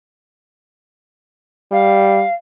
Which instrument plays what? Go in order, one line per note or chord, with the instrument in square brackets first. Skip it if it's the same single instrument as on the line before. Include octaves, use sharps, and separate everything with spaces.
[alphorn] G3 [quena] F5